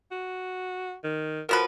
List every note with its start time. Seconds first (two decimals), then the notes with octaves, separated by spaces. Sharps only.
0.12 F#4
1.04 D#3
1.49 B2 F3 A#4 B4